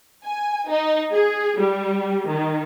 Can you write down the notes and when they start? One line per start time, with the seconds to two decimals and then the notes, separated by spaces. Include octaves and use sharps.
0.24 G#5
0.68 D#4
1.12 G#4
1.58 G3
2.28 D#3